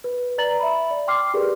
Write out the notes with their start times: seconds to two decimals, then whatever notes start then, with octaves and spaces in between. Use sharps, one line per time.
0.04 B4
0.38 B4 D5 A#5 A6 F#7
0.60 E5 B5
0.91 D5
1.08 G5 C6 D6 F6 C7
1.34 G4 G#4 A#4 B4 D5